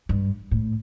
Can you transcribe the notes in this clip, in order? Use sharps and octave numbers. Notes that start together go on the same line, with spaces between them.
G2
A2